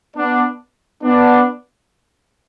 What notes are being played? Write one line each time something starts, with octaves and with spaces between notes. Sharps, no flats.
B3 D4
B3 D4